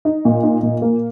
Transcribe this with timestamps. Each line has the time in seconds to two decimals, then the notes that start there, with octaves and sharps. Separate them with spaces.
0.05 D#4
0.25 A#2
0.43 D#4
0.63 A#2
0.82 A#3